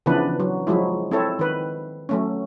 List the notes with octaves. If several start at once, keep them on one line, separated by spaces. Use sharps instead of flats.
C#3 E3 F3 B3 D4 B4
F#3
F3 F#3 G#3 E4
C4 E4 A4 C#5
D#3 B4
F#3 A3 C#4